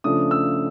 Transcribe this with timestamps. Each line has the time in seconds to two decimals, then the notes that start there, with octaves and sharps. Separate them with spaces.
0.04 C#3 F3 A3 D4 D#6
0.31 E6